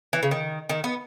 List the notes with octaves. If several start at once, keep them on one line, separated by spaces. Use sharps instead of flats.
E3
C#3
D#3
D#3
B3